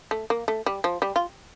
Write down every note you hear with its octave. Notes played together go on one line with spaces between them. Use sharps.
A3
A#3
A3
G3
F3
G3
F4